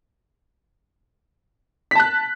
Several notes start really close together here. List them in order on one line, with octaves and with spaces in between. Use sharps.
B6 A5 F#6